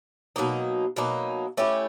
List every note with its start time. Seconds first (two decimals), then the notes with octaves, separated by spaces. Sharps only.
0.36 B2 F#3 A#3 D#4
0.96 B2 F#3 A#3 D#4
1.57 A3 C#4 E4 G4